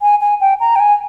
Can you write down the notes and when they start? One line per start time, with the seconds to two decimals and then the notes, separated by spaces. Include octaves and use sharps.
0.02 G#5
0.21 G#5
0.41 G5
0.60 A#5
0.76 G5
0.80 G#5